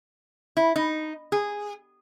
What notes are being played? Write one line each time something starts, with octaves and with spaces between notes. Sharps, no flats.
E4
D#4
G#4